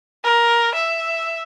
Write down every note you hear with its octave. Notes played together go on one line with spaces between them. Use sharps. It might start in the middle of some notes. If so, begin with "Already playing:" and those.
A#4
E5